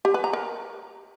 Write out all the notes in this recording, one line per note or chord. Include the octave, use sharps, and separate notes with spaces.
G4
B4
A#5
A#4